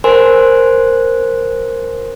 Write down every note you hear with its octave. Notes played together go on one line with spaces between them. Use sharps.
A#4 C5 G#5 C6